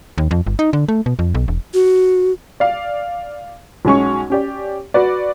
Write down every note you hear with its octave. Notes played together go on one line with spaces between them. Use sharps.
D#2
F2
G1
D#4
D3
A3
B2
F2
B1
E1
F#4
D5 F5
B1 G#3 C#4 C#6
C#4 G4 D5
F#4 B4 D5